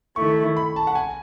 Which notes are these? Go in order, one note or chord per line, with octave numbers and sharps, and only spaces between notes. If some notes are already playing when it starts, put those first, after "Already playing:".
D#3 A3 E4 C#6
B5
A5
F#5
G#5